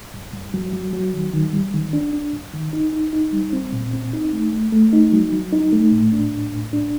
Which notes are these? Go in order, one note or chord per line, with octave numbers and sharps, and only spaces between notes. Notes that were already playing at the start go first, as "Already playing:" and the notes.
G2
G2
F#3
F#3
F#3
D#3
D#3
G3
D#3
D4
D4
G2
D#3
D#4
D#4
D#4
G3
C4
A#2
C4
D#4
A3
A3
A3
D#4
F#3
F#3
D#4
A3
A2
D4
A2
A2
D4